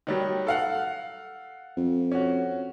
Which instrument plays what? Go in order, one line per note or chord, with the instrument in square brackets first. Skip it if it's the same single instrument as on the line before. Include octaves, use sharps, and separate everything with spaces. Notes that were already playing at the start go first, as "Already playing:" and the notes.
[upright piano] D#3 F#3 G3
A4 F5 F#5
[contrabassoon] F2
[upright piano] C#4 F#4